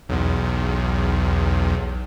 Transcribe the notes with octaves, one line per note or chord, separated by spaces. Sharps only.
B1 E2